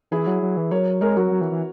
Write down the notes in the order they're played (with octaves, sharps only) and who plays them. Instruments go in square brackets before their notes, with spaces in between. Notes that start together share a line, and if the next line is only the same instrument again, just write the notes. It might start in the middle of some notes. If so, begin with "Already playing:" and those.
[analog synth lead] E3 [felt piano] E4 G#4
[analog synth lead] F#3
F#3
E3
[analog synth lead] F#3 [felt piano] A#4 C#5
[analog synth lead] G#3 [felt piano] A#4 C#5
[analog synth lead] F#3 [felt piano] F#4 A#4
[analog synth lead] F#3
E3
E3